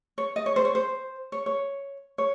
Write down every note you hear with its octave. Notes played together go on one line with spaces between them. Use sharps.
C#5
D#5
C#5
C5
C#5
C5
C#5
C#5
C#5